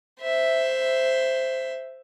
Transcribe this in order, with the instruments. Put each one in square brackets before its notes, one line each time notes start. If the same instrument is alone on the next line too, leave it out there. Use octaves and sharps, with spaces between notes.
[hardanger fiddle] C5 E5